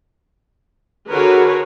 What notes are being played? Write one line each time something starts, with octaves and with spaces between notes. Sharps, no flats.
D3 F#4 G#4 A#4 B4 C#5